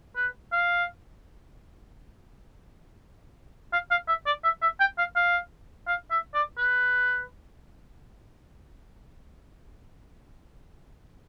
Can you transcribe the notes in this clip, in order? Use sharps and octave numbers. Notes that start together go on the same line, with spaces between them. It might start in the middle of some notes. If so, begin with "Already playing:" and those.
B4
F5
F5
F5
E5
D5
E5
E5
G5
F5
F5
F5
E5
D5
B4